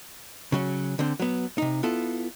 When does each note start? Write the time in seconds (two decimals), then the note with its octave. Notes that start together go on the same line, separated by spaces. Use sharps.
0.52 C#3 F#3 C#4
0.99 D3 C4
1.20 F#3 B3
1.58 C3 D#4
1.83 B3 E4 F4 A4